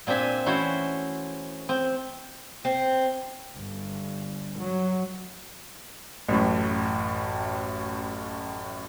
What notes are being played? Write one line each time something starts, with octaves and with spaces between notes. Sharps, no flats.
A#2 C4 D4 E5 G#5
E3 A3 C#4 E4 F#4 C5
C4
C4
G1
F#3
A1 F#2 A2